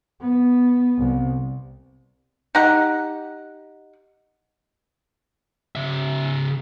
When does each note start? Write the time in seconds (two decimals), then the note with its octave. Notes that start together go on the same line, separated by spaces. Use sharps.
0.21 B3
0.98 C2
2.55 D#4 G4 F#5
5.76 C#3 E5